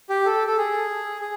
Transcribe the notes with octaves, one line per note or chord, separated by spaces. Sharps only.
G4
A4
A4
G#4
G#4